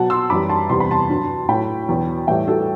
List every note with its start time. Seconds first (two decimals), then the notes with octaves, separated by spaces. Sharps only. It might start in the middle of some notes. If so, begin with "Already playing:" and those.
Already playing: B2 F#3 F#5 A5
0.10 C6 E6
0.30 F#2 E3 G3 B5 D6
0.49 A5 C6
0.69 E2 C3 E3 G3 C6
0.80 B5
0.91 A5 C6
1.10 G2 F#3
1.48 A2 F#3 G5 B5
1.89 E2 B2 F#3
2.27 A2 E3 G3 E5 G5
2.48 F#4 A4